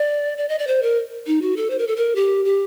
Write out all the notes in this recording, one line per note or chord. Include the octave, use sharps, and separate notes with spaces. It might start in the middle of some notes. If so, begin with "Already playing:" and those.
Already playing: D5
D5
D#5
D5
C5
A#4
D#4
F#4
A4
C5
A#4
A4
A#4
G4
G4